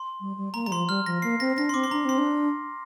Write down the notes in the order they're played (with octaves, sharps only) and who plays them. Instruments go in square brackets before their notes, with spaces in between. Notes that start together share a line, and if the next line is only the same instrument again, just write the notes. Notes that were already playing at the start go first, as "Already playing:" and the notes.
Already playing: [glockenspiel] C6
[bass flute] G3
G3
[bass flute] A#3 [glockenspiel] A#5
[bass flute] G3 [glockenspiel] A#5
[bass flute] F3 [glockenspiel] C6
[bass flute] G3 [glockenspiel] F6
[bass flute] F3 [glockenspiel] A#6
[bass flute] A#3 [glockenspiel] C7
[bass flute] C4 [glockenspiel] A#6
[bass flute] D4 [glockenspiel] A#6
[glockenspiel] C6
[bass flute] C4 [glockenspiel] D6
[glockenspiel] C6
[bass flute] D4 [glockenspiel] A#5
[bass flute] C4 [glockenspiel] C6
[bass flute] D4